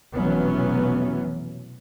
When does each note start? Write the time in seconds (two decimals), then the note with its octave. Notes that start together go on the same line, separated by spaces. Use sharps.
0.15 F1 B2 E3 F#3 B3 C#4